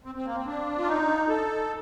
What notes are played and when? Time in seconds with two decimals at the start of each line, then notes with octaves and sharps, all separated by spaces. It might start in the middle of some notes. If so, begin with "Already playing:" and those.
0.04 C4
0.15 C4
0.25 A#3
0.36 C4
0.46 D4
0.79 F4
0.87 D#4
1.29 A4